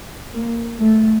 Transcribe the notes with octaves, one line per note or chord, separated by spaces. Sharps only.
A#3
A3